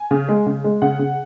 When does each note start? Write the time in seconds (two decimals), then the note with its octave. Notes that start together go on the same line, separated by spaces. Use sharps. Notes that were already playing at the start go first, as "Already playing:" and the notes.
Already playing: G#5
0.11 C#3
0.29 G#3
0.46 C#3
0.64 G#3
0.82 C#3 F#5
0.99 C#3